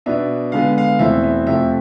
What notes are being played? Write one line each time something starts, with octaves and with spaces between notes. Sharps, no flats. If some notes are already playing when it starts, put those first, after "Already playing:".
B2 B3 D4 E5
D3 G#3 B3 F5
F5
E2 B2 A3 C4 E4 E5
E5
F2 C3 F3 A3 E5